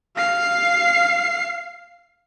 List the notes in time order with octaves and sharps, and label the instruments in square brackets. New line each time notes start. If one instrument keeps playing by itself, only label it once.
[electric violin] F5 C7